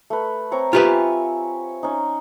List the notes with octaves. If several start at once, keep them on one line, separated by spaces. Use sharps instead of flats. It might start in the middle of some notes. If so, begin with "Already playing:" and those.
A3 B4
C4 C#5 A#5
F4 G4 B4 E5 G#5
C#4 D#4